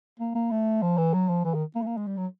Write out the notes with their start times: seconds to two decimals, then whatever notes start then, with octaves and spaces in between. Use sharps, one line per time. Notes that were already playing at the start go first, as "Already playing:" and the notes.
0.20 A#3
0.35 A#3
0.51 A3
0.82 F3
0.98 E3
1.14 F#3
1.29 F3
1.44 E3
1.54 D#3
1.76 A#3
1.82 A3
1.86 A#3
1.97 G#3
2.07 G3
2.17 F#3